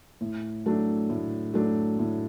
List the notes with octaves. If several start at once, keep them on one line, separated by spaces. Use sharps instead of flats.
A2
F#3 A3 D4
A2
F#3 A3 D4
A2